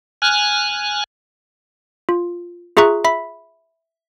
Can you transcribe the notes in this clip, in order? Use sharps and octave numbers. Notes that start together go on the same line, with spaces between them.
G#5 F6 F#6
F4
F4 G#4 E5 A#5 C#6 F#6
E5 B5 B6